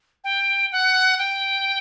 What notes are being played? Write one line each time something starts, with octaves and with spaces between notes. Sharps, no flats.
G5
F#5
G5